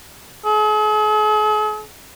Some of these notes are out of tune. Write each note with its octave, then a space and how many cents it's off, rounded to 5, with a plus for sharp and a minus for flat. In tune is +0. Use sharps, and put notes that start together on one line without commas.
G#4 +45